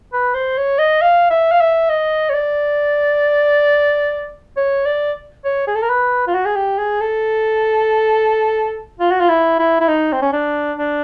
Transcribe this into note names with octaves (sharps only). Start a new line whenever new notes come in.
B4
C5
C#5
D#5
F5
E5
F5
E5
D#5
C#5
D5
C#5
D5
C#5
G#4
A4
A#4
B4
F4
F#4
G#4
G4
G#4
A4
F4
F#4
F4
E4
E4
E4
D#4
C4
C#4
D4
D4